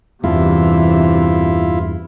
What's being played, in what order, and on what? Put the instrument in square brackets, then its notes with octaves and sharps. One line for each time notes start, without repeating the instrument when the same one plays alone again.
[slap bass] E2 G2 [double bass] C3 E3 [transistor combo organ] E4 F4